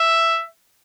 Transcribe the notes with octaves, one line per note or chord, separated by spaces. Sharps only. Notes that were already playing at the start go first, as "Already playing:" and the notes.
Already playing: E5